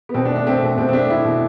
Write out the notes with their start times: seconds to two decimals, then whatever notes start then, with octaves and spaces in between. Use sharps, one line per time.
0.09 B3
0.14 B2 C4
0.25 D4
0.31 A3
0.36 D4
0.46 A3 C4
0.62 B2
0.77 B2 C4
0.89 C4
0.93 A3 D4
1.10 A3 E4
1.25 B2